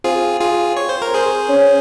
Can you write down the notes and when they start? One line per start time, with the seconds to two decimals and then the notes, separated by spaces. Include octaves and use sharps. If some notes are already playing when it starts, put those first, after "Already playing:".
0.04 C4 F4 G#4
0.40 F4 G#4
0.77 C#5
0.89 C5
1.02 A#4
1.14 G#4 C5
1.49 C#4